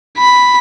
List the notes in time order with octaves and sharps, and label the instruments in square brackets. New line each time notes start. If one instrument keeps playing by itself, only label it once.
[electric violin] B5